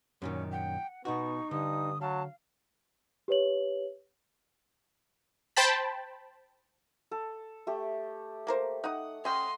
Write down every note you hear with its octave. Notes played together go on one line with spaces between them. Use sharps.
F#2 A#2 D#3 C#4
F#5 G5
B2 B3 D#4 F#4 C#6
G2 D3 D#6
F#3 F5 A5
G4 B4 C#5 F#7
C5 G5 A5 B5
A4
A3 G4
A#3 A#4 C5
D#4 F#5 D#6
C#4 D#5 G5 C6